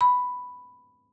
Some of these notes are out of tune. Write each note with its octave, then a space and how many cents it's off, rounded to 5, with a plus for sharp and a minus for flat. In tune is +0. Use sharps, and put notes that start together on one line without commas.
B5 +5